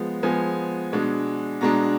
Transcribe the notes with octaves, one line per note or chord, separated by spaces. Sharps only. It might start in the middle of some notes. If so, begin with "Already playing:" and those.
Already playing: F3 G#3 B3
F3 G#3 B3 G#5
B2 G#3 D4
B2 G#3 D4 A#5